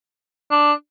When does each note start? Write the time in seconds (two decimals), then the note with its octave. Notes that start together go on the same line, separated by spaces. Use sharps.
0.51 D4